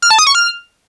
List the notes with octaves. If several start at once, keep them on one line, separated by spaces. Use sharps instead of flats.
F6
A5
D#6
C#6
F6